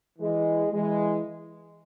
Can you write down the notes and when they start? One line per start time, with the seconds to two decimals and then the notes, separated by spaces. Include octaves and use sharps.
0.19 E3 G#3
0.72 E3 G#3